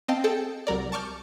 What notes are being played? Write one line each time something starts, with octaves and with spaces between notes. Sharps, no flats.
C4 D#5 F5 G5 A5
G#4 A4 G5
C2 F#3 A#4 D5
A5 C#6 D6 F6 G6